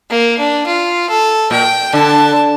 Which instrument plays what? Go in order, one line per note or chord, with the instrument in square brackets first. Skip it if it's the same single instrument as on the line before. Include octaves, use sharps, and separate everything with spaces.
[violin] A#3
D4
F4
A4
[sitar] A#2 [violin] G5
[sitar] D3 [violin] A5